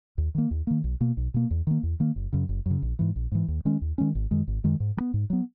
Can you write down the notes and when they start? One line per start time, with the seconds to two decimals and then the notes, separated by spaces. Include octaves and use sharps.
0.18 D#2
0.35 D#3 A#3
0.51 D#2
0.67 D#3 A#3
0.84 B1
1.01 B2 A#3
1.17 B1
1.34 B2 A#3
1.51 E2
1.67 D#3 A#3
1.83 E2
2.00 D#3 A#3
2.16 F#1
2.33 F#2 C#3
2.49 F#1
2.66 F#2 C#3
2.82 A#1
2.99 G#2 E3
3.16 A#1
3.32 G#2 E3
3.48 D#2
3.65 D#3 G#3 C#4
3.82 D#2
3.98 D#3 G#3 C#4
4.15 G#1
4.31 F#2 D#3 G#3
4.48 G#1
4.64 F#2 D#3 G#3
4.80 G#2
4.97 F#3
5.00 B3
5.14 G#2
5.30 F#3 B3